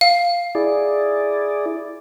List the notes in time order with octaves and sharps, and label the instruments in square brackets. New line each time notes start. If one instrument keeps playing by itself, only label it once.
[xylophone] F5
[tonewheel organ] E4 G#4 D5